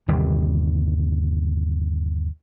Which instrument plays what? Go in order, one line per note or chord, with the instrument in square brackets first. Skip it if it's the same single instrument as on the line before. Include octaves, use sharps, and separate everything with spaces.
[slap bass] G1 D#2 C3 G3